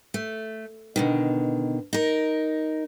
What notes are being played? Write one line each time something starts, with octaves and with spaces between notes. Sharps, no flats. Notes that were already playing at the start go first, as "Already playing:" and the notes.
A3
B2 D3 D#3
D#4 A#4